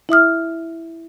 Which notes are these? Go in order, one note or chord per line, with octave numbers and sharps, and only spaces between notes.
E4 E5 D#6 F6